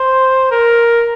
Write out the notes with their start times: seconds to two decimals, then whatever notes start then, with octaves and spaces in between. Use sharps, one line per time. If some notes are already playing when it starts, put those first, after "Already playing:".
Already playing: C5
0.51 A#4